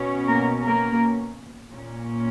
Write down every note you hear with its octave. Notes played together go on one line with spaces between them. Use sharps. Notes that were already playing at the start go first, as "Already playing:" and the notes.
Already playing: B2 C#4
A#3 A#4
A#3 A#4
A#2 A#3 C#4